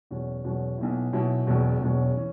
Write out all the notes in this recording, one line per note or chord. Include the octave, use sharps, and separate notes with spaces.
E2 B2 F#3 C#4
E2 B2 F#3 C#4
B1 B2 F#3 E4
B1 B2 F#3 E4
E1 E2 B2 F#3 C#4
E1 E2 B2 F#3 C#4
E3 C#4